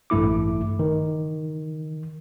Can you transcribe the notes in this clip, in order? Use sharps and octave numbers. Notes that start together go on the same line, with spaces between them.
A1 G2 A3 E4 D6
D#3